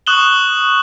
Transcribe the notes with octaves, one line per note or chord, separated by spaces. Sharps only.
C#6 D#6 F#6 E7 F#7 G7